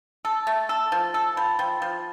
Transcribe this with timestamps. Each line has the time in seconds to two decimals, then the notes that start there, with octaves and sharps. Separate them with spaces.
0.25 A4 A5
0.47 A3
0.69 A4
0.92 F3
1.14 A4 A5
1.36 F3 B5
1.59 F3 G5
1.82 F3